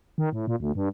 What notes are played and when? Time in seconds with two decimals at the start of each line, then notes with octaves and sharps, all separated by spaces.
0.18 D#3
0.33 A2
0.47 A#2
0.60 D2
0.75 G2